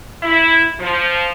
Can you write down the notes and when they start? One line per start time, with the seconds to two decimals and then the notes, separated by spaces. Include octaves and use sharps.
0.23 E4
0.80 F3